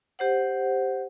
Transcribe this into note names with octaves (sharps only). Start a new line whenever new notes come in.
G4 C5 F#5